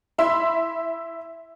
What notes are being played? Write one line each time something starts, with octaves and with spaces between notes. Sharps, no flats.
E4 E5 B5 C6